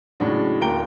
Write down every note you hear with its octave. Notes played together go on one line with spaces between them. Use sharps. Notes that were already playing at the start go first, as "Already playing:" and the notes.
A2 C#3 F#3 G#3 D4 D#4
D1 A#3 G5 A#5 D7 G7